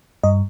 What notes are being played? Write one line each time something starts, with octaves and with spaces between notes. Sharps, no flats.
G2 D#5